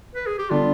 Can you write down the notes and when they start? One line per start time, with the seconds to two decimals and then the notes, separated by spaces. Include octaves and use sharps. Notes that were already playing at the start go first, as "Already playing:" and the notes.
0.15 B4
0.27 G#4
0.38 G4
0.50 D3 G3 B3 D4 F4